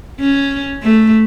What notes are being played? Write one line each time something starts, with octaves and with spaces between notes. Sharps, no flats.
C#4
A3